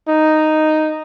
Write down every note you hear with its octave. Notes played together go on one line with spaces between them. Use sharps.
D#4